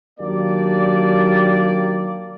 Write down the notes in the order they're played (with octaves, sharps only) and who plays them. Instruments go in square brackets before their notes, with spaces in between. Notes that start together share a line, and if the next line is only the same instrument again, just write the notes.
[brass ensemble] D#2 F#3 A#3 D4 G4 D5